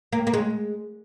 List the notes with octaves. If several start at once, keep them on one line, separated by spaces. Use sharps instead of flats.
A#3
A#3
G#3